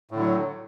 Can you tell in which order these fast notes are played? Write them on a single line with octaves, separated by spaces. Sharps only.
A2 D3 F#3